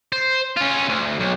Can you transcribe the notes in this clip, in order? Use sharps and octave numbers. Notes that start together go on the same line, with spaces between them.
C5
C#4 F4
D2
B1